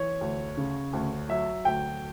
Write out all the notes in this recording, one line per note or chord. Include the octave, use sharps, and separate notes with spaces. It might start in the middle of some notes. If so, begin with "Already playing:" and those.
Already playing: E3 C#5
D2
C#3
D2
F#3 E5
D2 G5